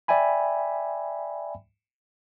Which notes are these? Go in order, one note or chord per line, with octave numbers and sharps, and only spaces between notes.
D5 E5 G5 G#5 B5